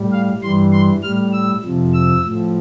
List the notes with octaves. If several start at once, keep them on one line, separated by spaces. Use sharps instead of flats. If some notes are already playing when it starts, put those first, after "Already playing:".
Already playing: A2 G3
F5
G2 E3 G3 C6
C6
A2 G3 F6
E6
F2 C3 F3
E6
A2 F3